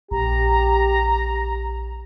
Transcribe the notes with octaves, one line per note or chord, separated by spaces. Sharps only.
A#1 G4 A#5